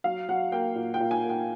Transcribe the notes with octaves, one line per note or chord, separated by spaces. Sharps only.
F#3 F5
F#3 F#5
A#3 G5
A#2
G5
A#2
G#5
A#3
G5